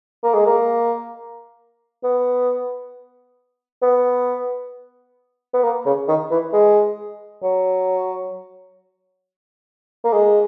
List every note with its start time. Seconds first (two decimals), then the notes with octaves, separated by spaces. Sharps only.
0.24 A#3
0.34 G#3
0.46 A#3
2.04 B3
3.82 B3
5.54 B3
5.64 A#3
5.86 C#3
6.08 D#3
6.31 E3
6.53 G#3
7.43 F#3
10.05 A#3
10.13 G#3